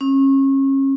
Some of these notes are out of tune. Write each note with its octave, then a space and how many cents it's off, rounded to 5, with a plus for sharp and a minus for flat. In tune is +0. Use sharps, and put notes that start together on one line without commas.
C#4 -30